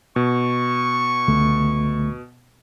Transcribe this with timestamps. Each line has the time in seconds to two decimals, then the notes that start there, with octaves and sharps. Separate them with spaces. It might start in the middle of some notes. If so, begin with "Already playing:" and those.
0.16 B2 C#6
1.28 C#2 D3 A3